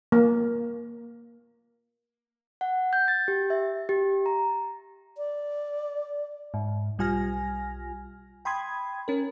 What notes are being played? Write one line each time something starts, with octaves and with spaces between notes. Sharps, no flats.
A#3
F#5
G6
A6
G4
E5
G4
A#5
D5
G#2
B1 G3 F4 G#5 F6 A#6
G5 B5 C6 D#6 G#6
C#4 A#4